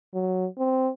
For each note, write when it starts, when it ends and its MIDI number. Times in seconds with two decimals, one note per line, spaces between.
0.14 0.47 54
0.58 0.90 60